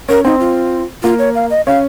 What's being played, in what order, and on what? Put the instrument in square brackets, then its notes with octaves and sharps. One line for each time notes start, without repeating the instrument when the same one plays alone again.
[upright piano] C#4 [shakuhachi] A#4
[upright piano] C4 [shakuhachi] D#4
[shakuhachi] F4
[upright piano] A#3 [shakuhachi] F4
[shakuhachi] C#5
F5
D#5
[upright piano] C#4 [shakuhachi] F5